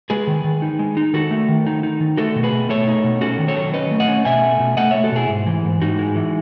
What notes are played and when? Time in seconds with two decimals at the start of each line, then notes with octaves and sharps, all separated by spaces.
0.10 G#3 G#4 B4
0.27 D#3
0.44 D#3
0.62 D#4
0.79 G#3
0.97 D#4
1.13 D#3 F#4 A4
1.31 A3
1.49 D#3
1.67 D#4
1.83 D#4
2.00 D#3
2.17 A3 F#4 A4
2.36 B2
2.43 G#4 B4
2.53 B2
2.69 A3 A4 C#5
2.87 D#4
3.04 B2
3.21 C#4 F#4 A4
3.39 D#3
3.48 A4 C#5
3.57 F#3
3.73 C#4 B4 D#5
3.91 A3
4.00 D#5 F#5
4.08 C#4
4.25 B2 E5 G#5
4.42 A3
4.60 B2
4.77 A3 D#5 F#5
4.91 A3 C#5 E5
5.04 F#4 A4
5.12 B2 E4 G#4
5.29 G#2
5.46 E3
5.65 G#2
5.82 G#2 D#4 F#4
5.99 G#3
6.16 E3